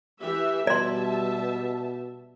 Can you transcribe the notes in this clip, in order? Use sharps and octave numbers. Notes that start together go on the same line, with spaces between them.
E3 G4 E5
B2 G3 D5 E5 A5 C6